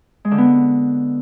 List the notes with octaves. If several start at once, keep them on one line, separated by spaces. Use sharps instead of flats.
G#3
D3
B3